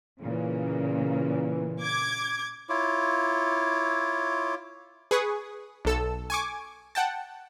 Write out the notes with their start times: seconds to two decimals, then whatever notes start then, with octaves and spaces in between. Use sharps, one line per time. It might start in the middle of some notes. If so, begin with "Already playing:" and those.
0.21 A#2 C#3 E3 A#3
1.81 D6 G#6
2.69 E4 F4 C#5 D6
5.11 G#4 B4 C#6 D#6
5.85 B1 A4 E6
6.30 G#5 C#6 D6
6.95 F#5 G5 A5